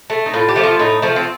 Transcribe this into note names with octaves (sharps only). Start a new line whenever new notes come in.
A3
D#4
A2 F4
G4
F3 A3
F4
A2 D#4
F3 A3
C4